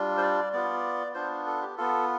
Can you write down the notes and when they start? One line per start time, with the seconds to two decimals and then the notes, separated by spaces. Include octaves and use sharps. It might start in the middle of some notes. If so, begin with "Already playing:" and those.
Already playing: G3 D4 F4
0.18 C5
0.22 D5
0.53 B3 F4 D5
1.15 B3 D4 F4 C5
1.47 A4
1.61 G4
1.78 B3 F4 A4